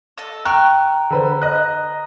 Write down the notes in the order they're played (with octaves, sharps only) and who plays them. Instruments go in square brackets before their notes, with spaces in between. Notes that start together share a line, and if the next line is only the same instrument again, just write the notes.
[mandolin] A4 D#5 E6
[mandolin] G5 C#6 F6 [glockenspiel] A#5 [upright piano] F#6
[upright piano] D3 B4 C5
D#5 F#6